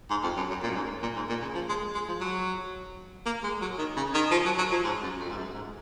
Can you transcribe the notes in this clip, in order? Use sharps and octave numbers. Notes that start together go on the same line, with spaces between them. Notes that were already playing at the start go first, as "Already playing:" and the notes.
G#2
F2
F#2
F#2
A#2
F#2
G#2
A#2
G#2
A#2
C#3
F3
G#3
G#3
F3
F#3
A#3
G#3
F#3
D#3
C#3
D#3
F3
F#3
F#3
F3
G#2
F#2
F2
G#2
F#2
G#2